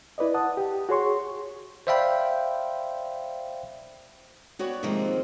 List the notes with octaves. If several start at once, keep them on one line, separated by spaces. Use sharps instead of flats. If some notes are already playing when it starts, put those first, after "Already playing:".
E4 B4 D5 D#5
F#5 A5 D#6
G4
F#4 G#4 C#5 C6 C#6
C5 D5 E5 F5 G5 B5
B3 F#4 C#5 D5 G5
C3 D#3 F3 G#3 A#3 C4